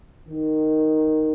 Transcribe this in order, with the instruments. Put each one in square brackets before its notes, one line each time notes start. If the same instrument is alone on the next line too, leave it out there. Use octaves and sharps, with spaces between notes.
[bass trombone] D#3